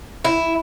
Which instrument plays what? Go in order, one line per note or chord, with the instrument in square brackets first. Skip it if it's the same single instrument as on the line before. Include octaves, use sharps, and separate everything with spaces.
[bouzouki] E4